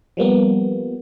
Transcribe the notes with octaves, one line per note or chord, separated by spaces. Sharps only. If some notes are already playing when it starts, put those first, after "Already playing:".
F3 G3 A#3 B3